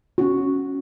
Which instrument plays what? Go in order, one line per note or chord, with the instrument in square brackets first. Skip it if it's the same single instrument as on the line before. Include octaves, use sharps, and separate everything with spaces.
[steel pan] C#4 F#4